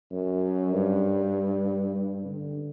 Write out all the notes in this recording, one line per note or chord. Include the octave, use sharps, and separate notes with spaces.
F#2
G2
G2
D3